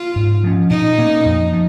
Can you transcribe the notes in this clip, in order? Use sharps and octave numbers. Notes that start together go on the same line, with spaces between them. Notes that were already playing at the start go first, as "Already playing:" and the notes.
Already playing: F4
G#2
F3 C#4
A#2 D#4
A#3 C#4
F2
F3